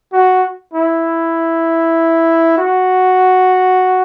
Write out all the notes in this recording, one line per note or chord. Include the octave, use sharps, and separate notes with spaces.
F#4
E4
F#4